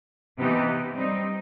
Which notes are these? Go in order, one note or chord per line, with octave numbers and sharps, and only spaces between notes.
C3 E3 B3 D#4 G4
G3 C4 D#4